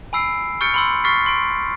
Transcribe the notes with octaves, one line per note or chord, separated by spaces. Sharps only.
G#5 B5 E6 C7 D7
C#6 F6 G6 A6 C#7 D7
B5 C6 E6
C#6 F6 A6 B6 C7
C6 D7